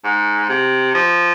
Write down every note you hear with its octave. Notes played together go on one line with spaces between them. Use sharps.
G#2
C3
F3